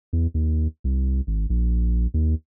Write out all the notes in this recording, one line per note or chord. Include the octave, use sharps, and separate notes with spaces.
E2
D#2
C2
G#1
A#1
D#2